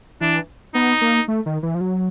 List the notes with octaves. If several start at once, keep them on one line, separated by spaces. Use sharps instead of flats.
E3 D4
B3 D#4
A#3
A3
D#3
E3
F3
F#3